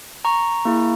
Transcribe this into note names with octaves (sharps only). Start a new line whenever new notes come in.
A#5 C#6
A#3 E4 G#4